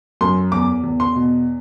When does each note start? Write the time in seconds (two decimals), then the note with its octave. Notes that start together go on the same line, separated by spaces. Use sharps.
0.21 F#2 C6
0.52 E2 D6
0.84 E2
1.00 C6
1.15 B2